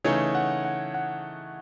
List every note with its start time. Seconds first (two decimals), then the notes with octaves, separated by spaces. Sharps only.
0.04 C#3 E3 A3 D#4 G#4 C#5
0.35 F#5
0.65 F#5
0.94 F#5